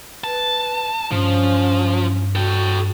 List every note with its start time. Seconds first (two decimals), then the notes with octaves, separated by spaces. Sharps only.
0.24 B4 A5
1.11 G2 F3 C#4
2.35 F#4 A4 G5